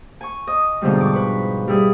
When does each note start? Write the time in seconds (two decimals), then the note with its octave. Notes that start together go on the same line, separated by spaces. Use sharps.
0.21 G#5 C#6
0.47 D#5
0.81 G#2 B2 D3 F3 G3
1.01 C#6 D6
1.14 B4 C#6
1.68 G3 E4 G#4